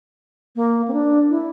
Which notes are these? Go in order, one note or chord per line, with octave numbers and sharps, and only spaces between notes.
A#3
C4
D4
E4